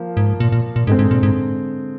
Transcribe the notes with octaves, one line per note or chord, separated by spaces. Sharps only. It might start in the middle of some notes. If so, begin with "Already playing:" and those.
Already playing: F3 A#3
G#2
A#2
A#2
A#2
G#2 D3 G#3 C4
G#2
A#2
G#2